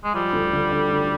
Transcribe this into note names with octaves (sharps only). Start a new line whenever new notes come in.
G#3
F3 G3
D2
D3
D3
D2